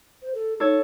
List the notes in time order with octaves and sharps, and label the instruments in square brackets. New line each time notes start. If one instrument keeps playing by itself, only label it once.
[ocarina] C5
A4
[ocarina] D#4 [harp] A4 C#5